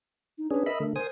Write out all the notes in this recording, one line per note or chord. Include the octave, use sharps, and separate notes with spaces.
D#4
C#4 D4 G#4 B4
A#4 D#5 E5 B5
D3 A3
A#4 C5 G#5 D#6